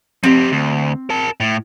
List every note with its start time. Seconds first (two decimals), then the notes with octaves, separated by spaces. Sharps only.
0.24 F3 C4 G4
0.52 D2
1.10 A#4 A5
1.40 A2